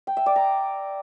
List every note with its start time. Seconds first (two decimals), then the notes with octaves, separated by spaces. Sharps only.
0.07 G5
0.17 E5
0.26 D5
0.36 A#5